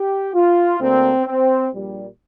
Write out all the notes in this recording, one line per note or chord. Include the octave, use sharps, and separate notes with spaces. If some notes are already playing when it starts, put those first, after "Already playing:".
Already playing: G4
F4
D2 D3 A#3 C4
C4
A#1 A#2 G3